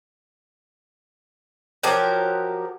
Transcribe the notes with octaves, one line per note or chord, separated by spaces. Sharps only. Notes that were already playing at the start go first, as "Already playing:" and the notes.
F3 F#3 G4 A#4